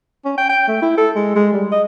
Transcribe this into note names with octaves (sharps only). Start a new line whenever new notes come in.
C#4
G5
G5
A3
E4
A4
G#3
G#3
G3
D#5